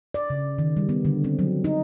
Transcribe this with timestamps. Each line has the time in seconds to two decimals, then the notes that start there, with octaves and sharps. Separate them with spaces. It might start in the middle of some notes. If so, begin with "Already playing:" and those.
0.14 D5
0.30 C#3
0.58 D#3
0.77 G3
0.89 B3
1.05 D3
1.24 C4
1.39 F#3
1.64 D#4